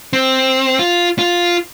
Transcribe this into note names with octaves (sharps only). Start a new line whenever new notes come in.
C4
F4
F4